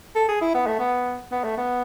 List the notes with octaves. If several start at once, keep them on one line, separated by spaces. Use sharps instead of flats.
A4
G#4
E4
B3
A3
B3
B3
A3
B3